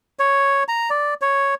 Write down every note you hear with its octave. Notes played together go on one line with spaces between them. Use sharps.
C#5
A#5
D5
C#5